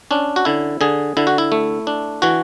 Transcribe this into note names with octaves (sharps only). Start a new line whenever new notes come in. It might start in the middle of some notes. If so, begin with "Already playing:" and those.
C#4 D4
F#4
D3 E4
D3 G#4
D3 E4
F#4
E4
A3
D4
E3 F#4